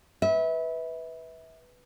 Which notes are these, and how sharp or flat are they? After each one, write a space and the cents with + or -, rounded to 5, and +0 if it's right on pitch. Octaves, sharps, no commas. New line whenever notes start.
B4 +0 E5 -30